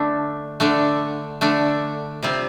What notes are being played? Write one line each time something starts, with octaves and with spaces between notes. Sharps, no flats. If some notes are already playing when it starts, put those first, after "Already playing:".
Already playing: D3 A3 D4
D3 A3 D4
D3 A3 D4
C3 G3 C4 F4